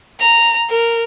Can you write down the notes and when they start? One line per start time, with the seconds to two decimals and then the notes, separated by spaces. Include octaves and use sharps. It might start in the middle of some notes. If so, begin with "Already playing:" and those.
0.20 A#5
0.70 A#4